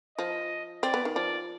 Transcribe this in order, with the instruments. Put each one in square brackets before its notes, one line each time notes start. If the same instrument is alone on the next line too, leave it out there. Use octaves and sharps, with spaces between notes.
[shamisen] F3 [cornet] D#5
[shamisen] C4 [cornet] D5
[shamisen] B3
D#3
[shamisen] F3 [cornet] D5